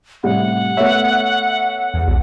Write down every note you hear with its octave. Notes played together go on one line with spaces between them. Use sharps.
A2 C3 G3 F#5
A3 B3 C#5 E5
E2
B1